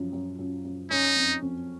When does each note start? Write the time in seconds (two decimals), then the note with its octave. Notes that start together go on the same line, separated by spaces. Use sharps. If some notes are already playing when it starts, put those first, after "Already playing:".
Already playing: F#2 F3
0.13 F#2
0.39 F#2
0.65 F#2
0.90 C#4 D#4
1.16 F2
1.42 F2